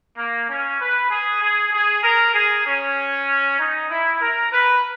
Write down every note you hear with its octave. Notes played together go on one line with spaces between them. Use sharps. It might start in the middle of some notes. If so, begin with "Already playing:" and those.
A#3
C#4
B4
G#4
G#4
G#4
A#4
G#4
C#4
D#4
E4
A#4
B4